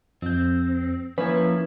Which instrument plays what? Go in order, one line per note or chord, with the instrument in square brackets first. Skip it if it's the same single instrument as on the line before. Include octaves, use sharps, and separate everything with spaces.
[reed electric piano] F2 G6 [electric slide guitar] C4
[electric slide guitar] F3 A#3 E4 [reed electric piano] C#4 [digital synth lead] B4